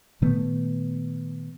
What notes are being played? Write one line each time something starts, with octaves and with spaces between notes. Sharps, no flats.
A#2 D#3 A3 B3